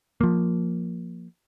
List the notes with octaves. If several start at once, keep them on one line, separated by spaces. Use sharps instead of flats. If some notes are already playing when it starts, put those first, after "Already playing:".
F3 A#3